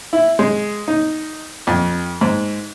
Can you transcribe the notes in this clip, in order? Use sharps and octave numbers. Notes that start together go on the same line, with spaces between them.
E4
G#3
D#4
F2
G#2